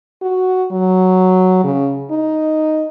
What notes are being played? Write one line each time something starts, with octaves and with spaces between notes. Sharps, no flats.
F#4
F#3
C#3
D#4